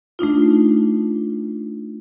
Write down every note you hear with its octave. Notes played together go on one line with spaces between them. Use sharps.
A3 D4 D#4 F4